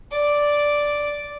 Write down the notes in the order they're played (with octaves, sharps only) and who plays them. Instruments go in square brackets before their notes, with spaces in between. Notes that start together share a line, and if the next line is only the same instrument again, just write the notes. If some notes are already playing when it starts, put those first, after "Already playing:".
[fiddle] D5